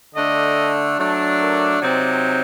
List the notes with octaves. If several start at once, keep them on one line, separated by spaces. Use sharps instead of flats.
D3 A3 D4 D#5
F#3 A3 D4
A#4
C3 F#3 C4 D#4 D5